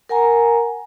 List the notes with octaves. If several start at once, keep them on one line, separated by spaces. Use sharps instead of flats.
A#4 F#5 G#5 A#5